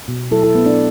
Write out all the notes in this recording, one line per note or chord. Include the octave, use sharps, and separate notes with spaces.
B2
F#3 E4 A4
E4 A4
A3 B3
D4